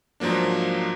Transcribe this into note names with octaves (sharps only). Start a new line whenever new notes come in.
G#2 F3 F#3 A#3 D4